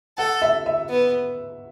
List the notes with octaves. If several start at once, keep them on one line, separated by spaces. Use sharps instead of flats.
A4 F#5
E5
E5
B3